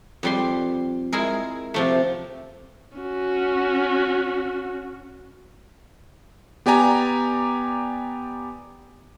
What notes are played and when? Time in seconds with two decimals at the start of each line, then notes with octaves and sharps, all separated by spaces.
0.23 F2 G3 C6
1.13 G#3 E4 G#4 A#4
1.74 C3 F3 A3
2.98 C#4 F#4
6.66 B3 G4 D5 G#5 A#5